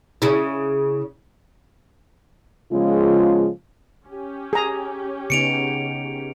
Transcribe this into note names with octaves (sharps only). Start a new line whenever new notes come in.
C#3 E4
C#3 F3 G#3 B3 F4
C#4 G4
G#4 A#5
C#3 B3 D#4 C#7 D7 F7